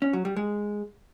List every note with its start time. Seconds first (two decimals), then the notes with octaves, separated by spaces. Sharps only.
0.02 C#4
0.13 F#3
0.25 G3
0.36 G#3